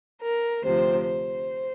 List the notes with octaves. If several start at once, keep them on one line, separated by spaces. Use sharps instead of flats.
A#4
D2 C3 F3 C5
C5